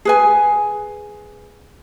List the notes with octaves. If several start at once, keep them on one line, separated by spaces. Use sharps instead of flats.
G#4 B4 G#5